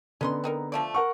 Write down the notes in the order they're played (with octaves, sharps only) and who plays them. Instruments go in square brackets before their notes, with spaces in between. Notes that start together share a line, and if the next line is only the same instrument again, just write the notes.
[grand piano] D3 B3 [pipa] C#4 D#4 C6
[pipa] C4 D#4 A#4
F3 A3 D5
[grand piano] A#4 F#5 C#6